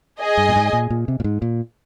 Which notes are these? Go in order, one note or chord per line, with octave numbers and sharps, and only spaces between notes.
G#4 D#5 G#5
G2
A#2
G#2
A#2
A#2
C3
A#2
G#2
A#2